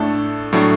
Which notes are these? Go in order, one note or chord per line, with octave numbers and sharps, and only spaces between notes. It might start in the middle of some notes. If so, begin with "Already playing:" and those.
Already playing: A2 A3 D4 A4
A2 F#3 A3 D4